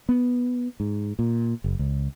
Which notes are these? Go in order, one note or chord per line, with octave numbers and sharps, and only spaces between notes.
B3
G#2
A#2
F#1
C#2